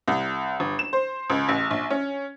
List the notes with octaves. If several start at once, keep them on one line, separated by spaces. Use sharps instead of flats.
C2
G1
E7
C5
C#2
A1
A#1
C#4